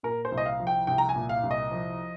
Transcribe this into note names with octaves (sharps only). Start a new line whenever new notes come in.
A#2 A#4
C5
C2
D#5
F5
F3
G5
C2 G5
A#5
G#5
A#2
F5
C2
D#5
F3